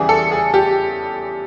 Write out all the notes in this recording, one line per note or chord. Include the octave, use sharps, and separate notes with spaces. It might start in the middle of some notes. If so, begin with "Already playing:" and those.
Already playing: E2 C#3 E3 G3 B3 G#4
A4
G#4
G4